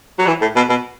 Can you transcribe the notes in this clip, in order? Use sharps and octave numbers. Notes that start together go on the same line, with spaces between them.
F#3
E3
A2
B2
B2